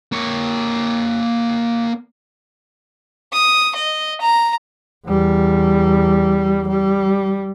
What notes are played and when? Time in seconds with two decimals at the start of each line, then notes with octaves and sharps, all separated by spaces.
0.12 A#3 C#5
3.33 D#6
3.75 D#5
4.21 A#5
5.07 E2 G3
6.68 G3